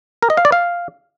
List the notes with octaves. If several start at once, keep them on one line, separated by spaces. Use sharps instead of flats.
A#4
D#5
F5
D5
F5